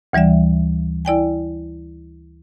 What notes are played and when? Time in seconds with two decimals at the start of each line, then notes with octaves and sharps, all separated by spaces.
0.13 D2 E3 G3 D5 E5
1.05 E4 D5 G5 G#5